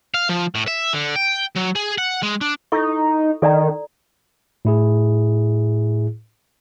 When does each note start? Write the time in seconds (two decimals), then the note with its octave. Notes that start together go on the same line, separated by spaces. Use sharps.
0.14 F5
0.29 F3
0.55 A2
0.67 E5
0.93 D3
1.16 G5
1.56 F#3
1.76 G#4
1.98 F#5
2.23 G#3
2.41 D4
2.72 D#4 E4 A4 C#6
3.42 D#3 A4 D5 A#5
4.65 A2 E4 G#4